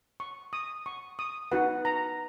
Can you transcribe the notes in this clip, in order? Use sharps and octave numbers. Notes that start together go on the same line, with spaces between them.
C#6
D#6
C#6
D#6
D#4 F#4 B4 F#5
A#5